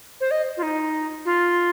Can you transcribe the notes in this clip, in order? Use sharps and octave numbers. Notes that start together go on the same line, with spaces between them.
C5
D#5
F4
D#4
F4